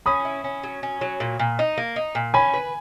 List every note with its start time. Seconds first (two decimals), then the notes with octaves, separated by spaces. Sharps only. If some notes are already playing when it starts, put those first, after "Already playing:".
0.06 C#4 B5 D#6
0.25 E4
0.44 C#4
0.63 F#3
0.83 C#4
1.01 F#3
1.20 A#2
1.39 A#2
1.59 D#4
1.78 A#3
1.96 D#4
2.15 A#2
2.34 C#4 G#5 B5
2.54 B4